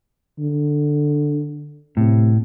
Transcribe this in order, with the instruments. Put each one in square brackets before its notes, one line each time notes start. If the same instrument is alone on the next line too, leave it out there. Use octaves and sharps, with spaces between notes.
[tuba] D3
[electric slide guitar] A2 [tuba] C3